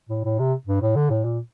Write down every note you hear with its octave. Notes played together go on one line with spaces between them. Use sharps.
A2
A2
C3
G2
A2
D3
A2
A#2